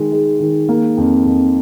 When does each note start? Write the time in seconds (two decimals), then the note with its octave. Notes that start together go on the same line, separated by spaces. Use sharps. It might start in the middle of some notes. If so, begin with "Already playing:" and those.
Already playing: D#3 G#3
0.12 G#3
0.40 D#3
0.69 A#3
0.97 F2
1.25 F2